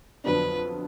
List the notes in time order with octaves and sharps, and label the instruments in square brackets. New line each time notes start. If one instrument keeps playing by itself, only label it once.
[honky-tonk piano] F2 D3 F#3 B3 D4 [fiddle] B4